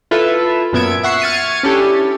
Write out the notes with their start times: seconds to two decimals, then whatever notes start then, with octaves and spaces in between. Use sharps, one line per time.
0.11 E4 F4 A4 B4 E5
0.72 F#2 A#2 B3 E5 G#6 D7
1.03 E5 F#5 C#6 C7
1.22 C#6 F6 G#6 A6 C#7 D#7
1.63 C#4 D4 E4 G4 A4